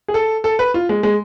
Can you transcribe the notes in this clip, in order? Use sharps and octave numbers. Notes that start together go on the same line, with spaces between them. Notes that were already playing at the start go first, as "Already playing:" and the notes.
G#4
A4
A4
B4
F4
G#3
G#3